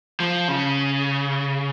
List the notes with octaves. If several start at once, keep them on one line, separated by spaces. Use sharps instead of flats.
F3
C#3